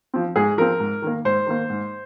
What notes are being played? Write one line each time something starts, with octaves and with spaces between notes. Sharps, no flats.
F3 C4
G#2 G#4
F3 C4 A#4
G#2
D#3 A#3
G#2 C5
D#3 A#3
G#2